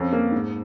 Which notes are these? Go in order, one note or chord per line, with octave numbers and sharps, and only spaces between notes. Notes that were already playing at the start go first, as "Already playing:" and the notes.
Already playing: F2 C#4
A#3
G#2